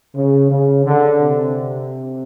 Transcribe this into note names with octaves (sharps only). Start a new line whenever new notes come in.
C#3
C#3
D3
C3